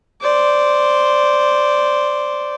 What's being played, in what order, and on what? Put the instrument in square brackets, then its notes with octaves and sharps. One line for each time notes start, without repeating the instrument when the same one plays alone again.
[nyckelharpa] C5 D5